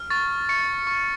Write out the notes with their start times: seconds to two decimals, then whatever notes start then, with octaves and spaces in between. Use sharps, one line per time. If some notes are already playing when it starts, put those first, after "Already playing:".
Already playing: F6
0.10 C#6 A6
0.49 C#6 C#7
0.87 C#6